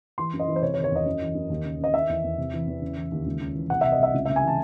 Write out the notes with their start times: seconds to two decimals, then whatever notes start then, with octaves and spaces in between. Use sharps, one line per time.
0.18 E3 C6
0.33 F#2
0.40 D#5
0.48 E3
0.56 C5
0.62 C3 C#5
0.74 C#5
0.77 D#3
0.84 C#5
0.92 E2 D#5
1.06 F#2
1.21 E3
1.35 F#2
1.50 D#2
1.65 C#3
1.80 C#3 D#5
1.94 D#3 E5
2.09 E2
2.24 E2
2.38 C3
2.53 E3
2.67 E2
2.82 C#3
2.96 E3
3.12 D#2
3.26 C#2
3.40 C#3
3.55 E3
3.70 C2 F#5
3.81 C3 E5
3.92 D#5
3.99 C2 E5
4.14 C#2
4.25 C#2 E5
4.36 G#5
4.43 E3 A5